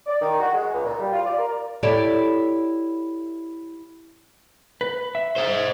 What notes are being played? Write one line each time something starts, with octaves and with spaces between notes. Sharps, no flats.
D5
D#3
F#4
G#3
C#2
A#2
G3
F4
D5
A#4
E4 G4 A4 C#5 D5
B4
E5
C5 D#5